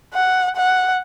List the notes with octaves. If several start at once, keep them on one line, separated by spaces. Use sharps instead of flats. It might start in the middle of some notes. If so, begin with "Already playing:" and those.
F#5
F#5